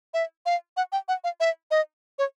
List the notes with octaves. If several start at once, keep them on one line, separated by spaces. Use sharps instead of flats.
E5
F5
F#5
G5
F#5
F5
E5
D#5
C#5